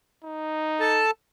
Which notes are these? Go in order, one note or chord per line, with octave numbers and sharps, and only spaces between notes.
D#4
A4 A5